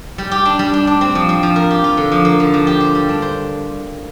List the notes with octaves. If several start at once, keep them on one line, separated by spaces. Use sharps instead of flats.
G3
G4
D4
G3
D4
D4
C4
F3
C4
F3
A#4
G4
F4
D3
F3
A#3
D3
F3
G4
C5
G3
D4
C5